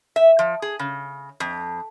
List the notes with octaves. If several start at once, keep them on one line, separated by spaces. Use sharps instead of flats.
E5
F3
G#4
C#3
F2